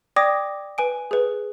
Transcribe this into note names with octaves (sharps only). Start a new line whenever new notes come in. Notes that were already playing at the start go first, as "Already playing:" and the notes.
D5 G5 D6 D#6 G#6 A#6
B4 G#5 D7
G#4 B4